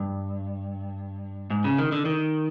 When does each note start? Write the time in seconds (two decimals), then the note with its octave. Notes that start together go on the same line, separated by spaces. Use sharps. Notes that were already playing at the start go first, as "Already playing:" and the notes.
Already playing: G2
1.50 G#2
1.64 C#3
1.78 D#3
1.92 D3
2.05 D#3